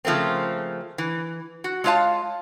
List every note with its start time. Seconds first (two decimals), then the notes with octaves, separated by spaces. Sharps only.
0.05 C#3 F3 A3 A#3 C4
0.98 E3
1.64 F#4
1.84 G#3 A3 F4 C#5 F5 A5